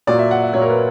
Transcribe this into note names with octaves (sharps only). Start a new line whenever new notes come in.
A#2 F#3 D5
E5
F#5
E5
A#2 F#3 C#5
A#4
B4